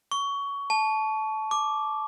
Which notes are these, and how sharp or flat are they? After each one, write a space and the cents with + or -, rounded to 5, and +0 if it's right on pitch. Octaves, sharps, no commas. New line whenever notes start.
C#6 +20
A5 -20
D6 +0